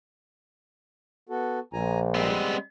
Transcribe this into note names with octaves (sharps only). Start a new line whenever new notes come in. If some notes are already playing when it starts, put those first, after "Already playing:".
B3 F#4 A4
A#1 G#5 A#5
G3 G#3 B3 C4